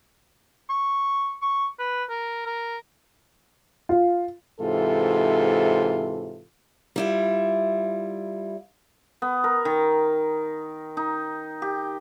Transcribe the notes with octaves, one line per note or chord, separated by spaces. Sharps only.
C#6
C#6
B4
A#4
A#4
F4
G#2 C3 E3 F4 A4
G3 E4 F4
B3
A#4
D#3
D#4
G4